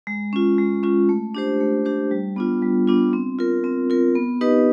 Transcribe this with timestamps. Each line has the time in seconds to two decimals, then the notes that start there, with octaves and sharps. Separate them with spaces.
0.07 G#3
0.33 C#4 F4
0.58 G#3
0.83 C#4 F4
1.09 A3
1.35 D4 G4 C5
1.60 A3
1.85 D4 G4 C5
2.11 G3
2.36 B3 D4 F4
2.62 G3
2.88 B3 D4 F4
3.13 C4
3.39 F4 A#4
3.64 C4
3.90 F4 A#4
4.15 B3
4.41 D#4 G4 B4 D#5